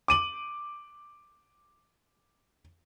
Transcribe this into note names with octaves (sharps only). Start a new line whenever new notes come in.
D6 D#7 F#7